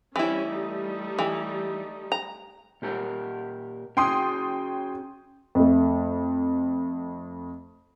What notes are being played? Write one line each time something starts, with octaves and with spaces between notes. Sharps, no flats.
E3 G3 C4 C#4 E4
G3 A3 D#4
E3
A#5
A#2 G4 A#4
C#4 F#4 G#4 G5 C6 D#6
F2 A3